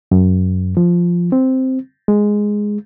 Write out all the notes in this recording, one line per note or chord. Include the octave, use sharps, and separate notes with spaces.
F#2
F3
C4
G#3